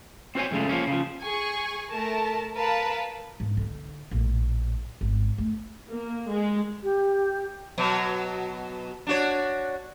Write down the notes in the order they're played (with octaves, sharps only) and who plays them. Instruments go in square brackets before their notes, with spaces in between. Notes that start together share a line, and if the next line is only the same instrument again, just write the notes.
[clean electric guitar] C4 F#4 C5 C#5 G#5
C2 F2 C#3 G#3 A3
F3 A#3 C#4
C#3 F3
[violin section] G#4 G#5 C#6
A3 A#4 A5
A#4 B4 F5 A5
[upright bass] G#2
D3 D#4
A#1 A2
G#1
A3
[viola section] A#3
G#3
[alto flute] G4
[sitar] B2 F#3
D4 F#4 C#5